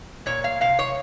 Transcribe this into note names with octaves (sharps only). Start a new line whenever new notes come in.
A#2 C#5
F5
C3 F5
C#5